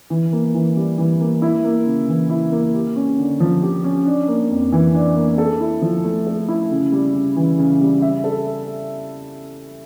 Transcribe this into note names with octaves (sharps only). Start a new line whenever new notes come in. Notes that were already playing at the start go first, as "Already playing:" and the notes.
E3
A#3
E3
G3
E3
A#3
E4
A#3
C#3
E3
E4
A#3
G4
C#4
D3
F3
G4
C#4
D4
A#3
F2
E3
D4
A#3
A4
E4
F3
A3
A4
E4
C#3
G3
C#3
E3
C#3
G3
E5
A4